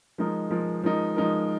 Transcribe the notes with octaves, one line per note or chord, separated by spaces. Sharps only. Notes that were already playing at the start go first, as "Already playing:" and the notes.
F3 G#3 D#4 A#4
F3 G#3 D#4 A#4
F3 G#3 D#4 A#4
F3 G#3 D#4 A#4